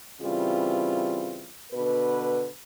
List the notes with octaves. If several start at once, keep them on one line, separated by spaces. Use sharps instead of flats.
C#3 E3 G3 C4 F4
B2 D3 B4